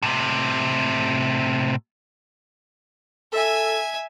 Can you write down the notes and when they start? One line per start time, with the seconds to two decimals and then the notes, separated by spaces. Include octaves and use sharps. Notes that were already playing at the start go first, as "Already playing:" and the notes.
0.02 A2 C3
3.33 A4 E5 G#5